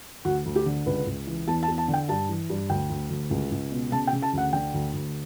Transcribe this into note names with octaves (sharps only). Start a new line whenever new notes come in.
D2 F#4
D2
G4
D3
C#2 B4
C#2
E3
E2 A5
A5
E2
A5
D3
G5
G2 A5
E3
G2
D2 G5
D2
D2
C#2
C#2
B2
C#3 A5
G5
C#3
A5
D2 F#5
D3 G5
D2
D2